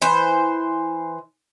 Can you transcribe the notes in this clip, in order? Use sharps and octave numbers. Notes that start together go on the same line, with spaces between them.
E3 C5